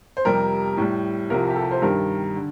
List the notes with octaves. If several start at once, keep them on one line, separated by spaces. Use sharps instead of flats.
C5
F2 C3 G3 A#4
A2 G3
C2 C3 F3 A#4
G4
A4
C5
G2 D#3 G3 A#4
D3